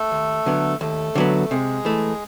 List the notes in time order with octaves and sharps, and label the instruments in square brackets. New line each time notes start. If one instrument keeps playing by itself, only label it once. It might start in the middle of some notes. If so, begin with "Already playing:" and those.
Already playing: [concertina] A3 A4
[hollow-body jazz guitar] D#2
D3 F#3 B3
[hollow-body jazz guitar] D#2 [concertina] A3 A4
[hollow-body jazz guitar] D3 F#3 B3
[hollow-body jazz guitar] C3 [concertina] G#3 G#4
[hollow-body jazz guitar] E3 A3